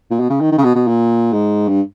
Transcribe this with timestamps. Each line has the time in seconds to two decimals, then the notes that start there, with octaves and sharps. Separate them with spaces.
0.11 A#2
0.20 B2
0.29 C#3
0.41 D#3
0.52 D#3
0.58 C#3
0.64 B2
0.76 B2
0.87 A#2
1.33 G#2
1.68 G2